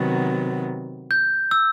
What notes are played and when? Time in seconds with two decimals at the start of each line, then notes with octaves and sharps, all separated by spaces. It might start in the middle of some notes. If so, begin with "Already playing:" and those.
Already playing: C3 D#3 F#3 B3
1.11 G6
1.51 E6